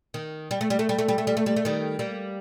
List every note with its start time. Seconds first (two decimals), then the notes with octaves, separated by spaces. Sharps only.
0.14 D#3
0.51 G3
0.61 A3
0.70 G3
0.79 A3
0.89 G3
0.99 A3
1.08 G3
1.18 A3
1.27 G3
1.37 A3
1.46 G3
1.56 A3
1.65 D#3 G3
1.99 G3 A#3